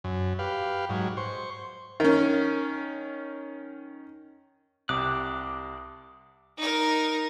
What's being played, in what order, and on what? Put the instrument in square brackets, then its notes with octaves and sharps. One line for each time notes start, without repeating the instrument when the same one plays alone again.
[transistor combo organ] F#2
G4 B4 F5
G#2 F#3
C5 C#6
[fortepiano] D#3 C#4
[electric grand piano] C2 C3 [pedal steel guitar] D6 F#6 [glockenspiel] D#6
[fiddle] D#4 A#4